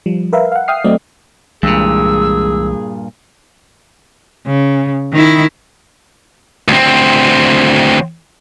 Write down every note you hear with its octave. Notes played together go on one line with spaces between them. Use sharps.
F3 G3
A#4 B4 E5 F5
F5 F#5
E5 G5 D#6 F6 C7
F#3 A3 C4 D5 D#5
C2 G2 A#2 E3 G#3 G#4 E6
C#3
D#3 E4
D2 C4